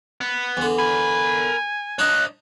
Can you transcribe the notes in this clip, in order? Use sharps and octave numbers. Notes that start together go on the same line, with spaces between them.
B3
E2 D3
A#4 G#5 B5
D4 D#4 C#5 D#5 F#6